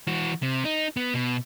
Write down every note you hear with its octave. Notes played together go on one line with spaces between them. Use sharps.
E3 F#4
C3
D#4
B3
B2